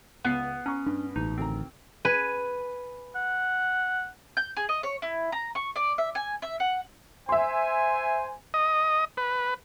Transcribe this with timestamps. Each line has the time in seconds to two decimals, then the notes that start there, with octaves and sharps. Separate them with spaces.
0.25 C#2 B3 C7
0.66 C#4 A#5 C#6
0.86 G2 D4
1.16 A1 G#2 B2 D#4
1.38 D2 D#3 C4 A#5
2.05 B4 G#5
3.15 F#5
4.37 G6
4.57 G#4
4.69 D#5
4.83 C#5
5.02 E4
5.32 A#5
5.55 C#6
5.76 D5
5.98 E5
6.15 G#5
6.42 E5
6.60 F#5
7.29 C5 E5 G#5 C6
8.54 D#5
9.17 B4